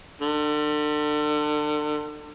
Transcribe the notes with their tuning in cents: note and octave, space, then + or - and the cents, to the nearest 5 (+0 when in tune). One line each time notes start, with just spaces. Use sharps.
D3 +35